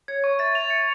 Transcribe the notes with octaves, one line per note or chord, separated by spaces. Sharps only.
C#5 G#6
C#6
E5 A6
F7
C#7